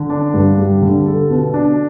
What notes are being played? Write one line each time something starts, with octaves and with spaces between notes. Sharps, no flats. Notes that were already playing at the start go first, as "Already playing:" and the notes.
Already playing: D3
D4
G2
G3
D3
A4
B2
D4